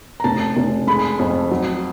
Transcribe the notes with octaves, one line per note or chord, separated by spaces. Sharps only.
A#5
F1 A5
F1
G#3 B5
F2
F#3